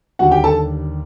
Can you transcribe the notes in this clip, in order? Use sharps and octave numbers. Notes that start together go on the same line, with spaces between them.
D#2 D3 G3 F#4 F#5
G4 G5
A4 A5